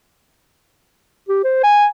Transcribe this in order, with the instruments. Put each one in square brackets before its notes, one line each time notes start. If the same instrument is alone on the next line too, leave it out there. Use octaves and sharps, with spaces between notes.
[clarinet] G4
C5
G#5